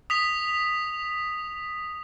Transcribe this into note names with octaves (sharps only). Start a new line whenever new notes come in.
D#6 B6 F7